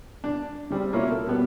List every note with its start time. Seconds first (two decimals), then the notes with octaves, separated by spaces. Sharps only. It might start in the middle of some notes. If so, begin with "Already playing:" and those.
0.24 D4
0.70 C#3 G3 C4
0.93 B2 A#3 C#4 E4 F4
1.10 A4
1.27 B2 G3 B3